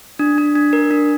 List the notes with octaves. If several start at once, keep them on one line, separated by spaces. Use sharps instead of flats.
D4
D4
D4
A#4
D4